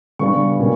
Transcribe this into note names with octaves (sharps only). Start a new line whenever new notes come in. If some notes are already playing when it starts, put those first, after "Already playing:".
C#3 G3 B3 D4 C#6
B2 G3 A#3 C#4